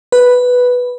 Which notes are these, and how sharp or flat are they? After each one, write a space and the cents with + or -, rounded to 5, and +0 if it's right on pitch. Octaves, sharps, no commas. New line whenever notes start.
B4 +0